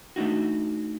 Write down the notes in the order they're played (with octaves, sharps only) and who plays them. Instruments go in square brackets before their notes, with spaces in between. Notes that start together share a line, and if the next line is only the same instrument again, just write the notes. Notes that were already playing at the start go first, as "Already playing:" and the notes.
[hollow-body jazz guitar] A3 D4 D#4 F#4